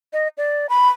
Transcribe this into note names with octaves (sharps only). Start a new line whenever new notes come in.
D#5
D5
B5